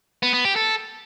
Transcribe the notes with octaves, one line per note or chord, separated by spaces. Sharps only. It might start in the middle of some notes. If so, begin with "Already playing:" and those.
B3
B3
G4
A4